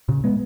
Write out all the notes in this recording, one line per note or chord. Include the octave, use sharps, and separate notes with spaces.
A#2 C#3
G#3 B3